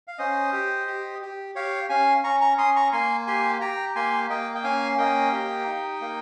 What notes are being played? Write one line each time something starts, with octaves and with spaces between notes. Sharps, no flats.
F5
C#4 C5 D#5
G4
G4
G4
G4 C#5 F5
C#4 F5 G#5
C#4 A#5 C#6
A#5 C#6
C#4 C6 D#6
A#5 C#6
A#3 G#5 C6
G4 G#5 C6
G4 G5 A#5
A#3 G#5 C6
A#3 D#5 G5
G5
C#4 F5 G#5
A#3 D#5 G5
G4
D#4
A#3